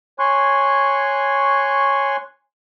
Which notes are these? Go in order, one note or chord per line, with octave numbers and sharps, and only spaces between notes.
C#5 G#5 C6 C#6 F#6